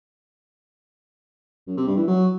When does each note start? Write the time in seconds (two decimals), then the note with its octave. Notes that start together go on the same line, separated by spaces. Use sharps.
1.67 F#2
1.77 C3
1.87 G2
1.97 E3
2.07 F#3